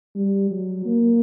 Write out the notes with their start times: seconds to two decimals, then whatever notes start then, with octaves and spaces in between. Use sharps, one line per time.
0.15 G3
0.51 F#3
0.85 A#3